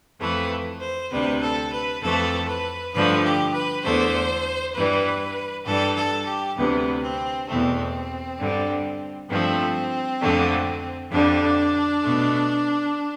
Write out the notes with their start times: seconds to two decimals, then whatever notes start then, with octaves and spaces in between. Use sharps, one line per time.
0.21 F2 E3 A3 B4
0.81 C5
1.11 D2 C3 G3 B4
1.42 A4
1.73 B4
2.03 F2 E3 A3 A4
2.48 B4
2.93 G2 D3 F3 A3 B4
3.24 G4
3.54 B4
3.84 E2 D3 A3 C5
4.75 G2 E3 G3 B4
5.66 G2 E3 G3 A4
5.96 A4
6.26 G4
6.57 D2 C3 E3 B3
7.02 C4
7.48 E2 B2 A3 C4
8.39 G2 D3 G3
9.29 G2 F3 A3 C4
10.20 F2 D3 A3
11.12 F2 D3 G3 D4
12.03 B2 A3